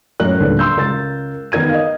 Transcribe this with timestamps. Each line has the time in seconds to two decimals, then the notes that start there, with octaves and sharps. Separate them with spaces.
0.20 F#2 A2 A#4 F#6
0.39 D#1 D3 B4
0.59 C6 E6 G6
0.76 C#2 A#4 A6
1.52 D#3 B3 A#4 G#6 D#7
1.70 D#5 F5